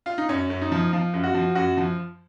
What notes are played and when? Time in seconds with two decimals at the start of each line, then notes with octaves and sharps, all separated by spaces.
0.06 F4
0.18 D#4
0.29 F#2 C#4
0.50 F#2
0.61 D#4
0.72 F3
0.93 F3 F4
1.14 F#2
1.23 F#4
1.34 F3
1.55 F#2 F#4
1.77 F3